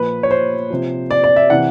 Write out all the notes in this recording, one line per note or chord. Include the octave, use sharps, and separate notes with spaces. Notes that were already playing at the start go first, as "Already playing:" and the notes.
Already playing: A#2 F3 B4
C#5
C5
C3 F3
D5
D5
E5
C3 E3 F#5